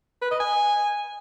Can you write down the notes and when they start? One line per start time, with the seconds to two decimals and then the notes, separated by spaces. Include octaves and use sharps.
0.22 B4
0.31 D#5
0.40 G#5